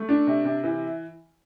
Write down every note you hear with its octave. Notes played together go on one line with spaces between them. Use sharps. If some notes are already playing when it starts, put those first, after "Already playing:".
Already playing: A3
D4
C3
C3
E3